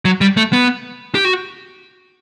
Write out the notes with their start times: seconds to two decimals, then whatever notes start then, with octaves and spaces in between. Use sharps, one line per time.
0.05 F#3
0.21 G3
0.37 A3
0.53 B3
1.15 G4
1.25 F#4